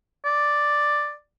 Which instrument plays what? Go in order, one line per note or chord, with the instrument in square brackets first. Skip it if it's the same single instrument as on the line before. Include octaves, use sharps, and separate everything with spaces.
[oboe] D5